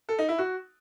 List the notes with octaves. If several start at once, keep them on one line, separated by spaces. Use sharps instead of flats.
A4
D#4
E4
F#4